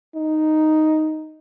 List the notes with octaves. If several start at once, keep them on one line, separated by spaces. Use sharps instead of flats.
D#4